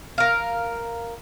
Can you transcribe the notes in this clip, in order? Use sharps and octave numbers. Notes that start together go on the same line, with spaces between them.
A#4 F5